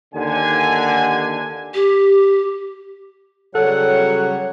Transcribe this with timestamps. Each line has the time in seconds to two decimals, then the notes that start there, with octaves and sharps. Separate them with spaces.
0.15 D#2 D3 G#5
1.74 G4
3.55 C#3 F#3 G3 A4 C#5 F#5